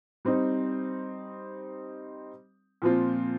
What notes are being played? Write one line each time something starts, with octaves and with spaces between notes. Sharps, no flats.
G3 C4 D#4
A#2 F3 C4 F4